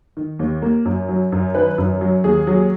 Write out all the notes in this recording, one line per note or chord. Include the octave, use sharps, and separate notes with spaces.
D#3
D#2
A#3
F#2
F#3
F#2
D#3 B4
F#2
F#3
D#2 G#4
F#3